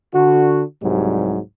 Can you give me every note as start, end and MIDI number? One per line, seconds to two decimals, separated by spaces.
0.13 0.61 50
0.13 0.61 66
0.82 1.38 36
0.82 1.38 44
0.82 1.38 54
0.82 1.38 55